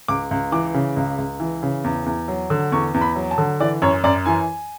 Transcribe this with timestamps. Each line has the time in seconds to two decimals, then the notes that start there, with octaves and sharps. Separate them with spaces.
0.08 C#2 D6
0.31 C#2
0.52 E3 D6
0.74 C#3
0.97 C#2
1.18 C#2
1.40 E3
1.63 C#3
1.84 E2
2.06 E2
2.28 F#3
2.50 D3
2.72 E2 C#6
2.94 E2
3.01 B5
3.16 F#3
3.31 A5
3.38 D3
3.60 E3 D5
3.82 F#2 C#5
4.04 F#2 D5
4.26 E3 G#5